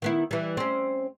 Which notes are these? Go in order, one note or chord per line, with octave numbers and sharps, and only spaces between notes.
D#3 B3 E4
E3 G3
C4 C#4